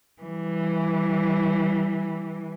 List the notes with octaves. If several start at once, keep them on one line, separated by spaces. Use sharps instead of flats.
E3 G3